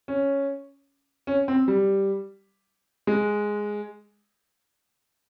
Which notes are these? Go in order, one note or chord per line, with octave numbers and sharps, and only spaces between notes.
C#4
C#4
C4
G3
G#3